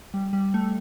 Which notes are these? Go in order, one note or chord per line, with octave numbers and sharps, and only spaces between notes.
G3
G3
A3